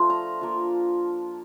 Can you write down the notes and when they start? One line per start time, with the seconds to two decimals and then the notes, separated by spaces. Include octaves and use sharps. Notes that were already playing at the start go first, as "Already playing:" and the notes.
Already playing: F3 A3 D4 F4 C6
0.10 A#5
0.41 A#3 F4